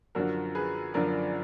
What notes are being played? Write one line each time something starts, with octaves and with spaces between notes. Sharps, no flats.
F#2 D3 F3 F#4 A#4
G#4 B4
F#2 D3 F3 A#4 D5